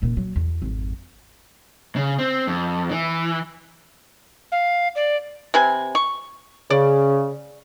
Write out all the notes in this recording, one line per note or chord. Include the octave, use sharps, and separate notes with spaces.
D#1 A#2
F#3
E2
G#1 F2
C#3
C4
F2
E3
F5
D5
C3 B4 G#5
C#6
C#3 D5